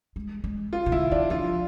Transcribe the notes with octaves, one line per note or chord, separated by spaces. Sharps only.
G#3
G#3
F4
C3
D3 E4
E3 D4
F3 F4